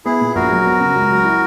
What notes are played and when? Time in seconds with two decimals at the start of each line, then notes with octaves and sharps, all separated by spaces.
0.05 B3 E4 G#4
0.21 A#2
0.35 A#1 F#4 A#4
0.51 F#3
0.66 B3
0.80 C#3
0.96 C#2
1.11 F#3
1.25 E4